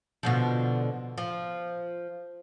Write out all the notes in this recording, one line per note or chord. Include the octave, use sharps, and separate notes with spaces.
B2 D3 F3
F3